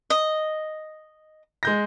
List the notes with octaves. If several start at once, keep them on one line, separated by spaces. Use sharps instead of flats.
D#5
G#3 G6 A#6